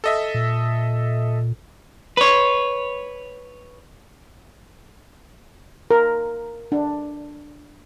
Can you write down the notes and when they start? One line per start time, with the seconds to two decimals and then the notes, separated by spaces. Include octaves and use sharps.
0.04 A4 D#5 E5
0.34 A#2
2.17 B4 C#5
5.91 A#4
6.72 D4